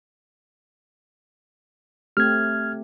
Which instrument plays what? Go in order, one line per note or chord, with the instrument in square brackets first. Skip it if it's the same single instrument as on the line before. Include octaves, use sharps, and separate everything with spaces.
[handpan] A3 C4 G4 [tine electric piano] F6 G#6